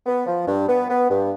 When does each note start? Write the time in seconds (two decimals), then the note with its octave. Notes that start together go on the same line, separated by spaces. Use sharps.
0.06 B3
0.26 F3
0.47 G2
0.68 B3
0.88 B3
1.09 G2